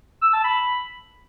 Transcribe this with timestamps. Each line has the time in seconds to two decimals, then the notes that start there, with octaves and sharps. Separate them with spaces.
0.22 E6
0.33 A5
0.44 B5